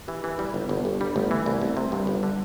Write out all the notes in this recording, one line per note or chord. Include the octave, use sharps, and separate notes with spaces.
E3 G4
E3
G3 E4
G1
G1 A4
G1 G4
G3 D4
G1 A3
E3
C2
C2
C3
G2 G3
G1
D3